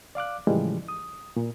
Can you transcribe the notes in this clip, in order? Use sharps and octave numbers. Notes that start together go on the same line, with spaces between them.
D5 F5 D6 F#6
A2 C#3 E3 F3 G3 G#3
D#6
A#2